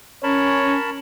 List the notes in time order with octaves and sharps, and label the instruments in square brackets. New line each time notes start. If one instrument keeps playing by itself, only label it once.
[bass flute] C#4 [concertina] A#4 A5 B5 [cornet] C#5